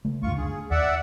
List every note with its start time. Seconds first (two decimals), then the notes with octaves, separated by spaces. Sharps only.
0.05 C#3 A3
0.23 D2 G2 F4 C#6
0.37 D4 G#4
0.71 D#2 D5 E5 F#5